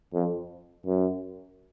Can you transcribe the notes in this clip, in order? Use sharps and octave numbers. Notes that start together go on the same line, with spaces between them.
F2
F#2